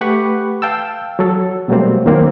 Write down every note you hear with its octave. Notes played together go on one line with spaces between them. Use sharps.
A3 G4 B4 F#5 B5 C#6
F5 G5 A5 E6
F#3 A4
B2 F#3 G3 A3 A#3 C4
D#2 D#3 F#3 A#3 C4